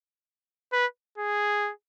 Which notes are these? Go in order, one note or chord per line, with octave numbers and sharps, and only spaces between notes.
B4
G#4